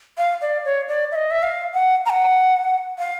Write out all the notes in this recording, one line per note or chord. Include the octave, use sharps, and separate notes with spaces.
F5
D5
C#5
D5
E5
D#5
E5
F5
F#5
A#5
F#5
F5